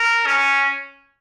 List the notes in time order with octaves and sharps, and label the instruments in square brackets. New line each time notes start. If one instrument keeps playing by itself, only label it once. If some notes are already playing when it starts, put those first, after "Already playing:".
Already playing: [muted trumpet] A#4
C#4